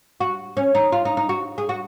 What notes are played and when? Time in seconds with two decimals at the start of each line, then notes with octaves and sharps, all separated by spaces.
0.20 F#4
0.57 C#4
0.75 D#4
0.92 F4
1.05 D#4
1.17 D#4
1.29 F#4
1.58 G#4
1.69 F#4